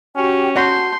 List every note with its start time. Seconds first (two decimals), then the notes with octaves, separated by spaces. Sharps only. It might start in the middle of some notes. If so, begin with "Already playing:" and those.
0.16 C#4 F#4 G4 G5
0.56 F#4 A5 C6 G6